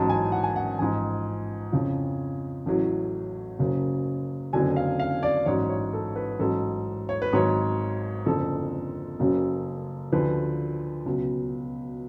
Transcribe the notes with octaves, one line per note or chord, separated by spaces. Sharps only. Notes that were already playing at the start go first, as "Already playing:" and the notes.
Already playing: A1 G#2 F#3 A5
G#5
F#5
G#5
F#5
A1 G#2 F3 G#5
F2 C#3 F3
A1 A2 F#3
F#1 F#2 C#3 F#3
F#1 F2 D3 F#3 G#5
F5
F5
D5
A1 G#2 F#3 C#5
C#5
A4
B4
A1 G#2 F#3 A4
C#5
B4
G#1 G#2 F#3 C#5
F#1 F2 D3 F3 A4
F#1 F#2 C#3 F#3
D2 D3 F3 B4
C#2 B2 F#3